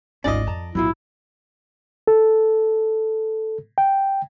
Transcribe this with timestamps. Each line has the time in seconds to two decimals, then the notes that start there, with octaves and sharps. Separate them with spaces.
0.24 G#1 D2 C#4 D#4 F4 D5 D#5
0.47 F2 A5 A#5
0.75 A#1 G#2 F#3 B3 E4 F4
2.07 A4
3.78 G5